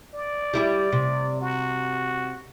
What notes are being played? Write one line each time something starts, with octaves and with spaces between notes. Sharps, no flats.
D5
G3 E4 G4
C3
F#4